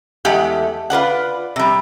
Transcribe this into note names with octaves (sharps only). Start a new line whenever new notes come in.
E2 G#3 A3 G4 F#5
F4 B4 D5 F#5
C3 G3